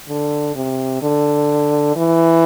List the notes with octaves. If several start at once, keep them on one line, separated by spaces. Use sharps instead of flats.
D3
C3
D3
E3